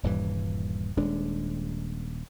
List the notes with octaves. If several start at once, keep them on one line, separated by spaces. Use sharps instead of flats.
D#1 G2 E3
D#1 G#3 D4